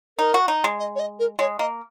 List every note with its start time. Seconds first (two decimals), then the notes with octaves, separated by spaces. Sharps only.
0.18 D#4 A#4
0.34 F#4
0.48 D#4
0.64 G#3
0.79 D#5
0.95 C#5
0.99 D#5
1.19 A#4
1.39 G#3 C#5
1.59 A#3 D#5